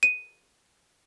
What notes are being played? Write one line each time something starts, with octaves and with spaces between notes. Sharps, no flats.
D#7